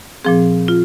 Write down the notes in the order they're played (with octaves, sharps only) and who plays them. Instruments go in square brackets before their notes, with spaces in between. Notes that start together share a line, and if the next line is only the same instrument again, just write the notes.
[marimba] A#2 F3 C4 G#4
F4